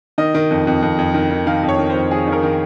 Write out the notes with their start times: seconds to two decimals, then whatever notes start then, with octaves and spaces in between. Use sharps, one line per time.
0.18 D#3 D#5
0.34 D#3
0.51 F2
0.67 F2
0.82 F2
0.98 F2
1.14 D#3
1.31 D#3
1.47 D#3 F5
1.63 F2
1.69 C#5
1.79 D#3
1.90 C5
1.95 F2
2.11 D#3 G#4
2.27 D#3 A#4
2.43 D#3